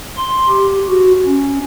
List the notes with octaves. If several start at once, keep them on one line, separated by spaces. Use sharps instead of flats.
C6
G4
F#4
C#4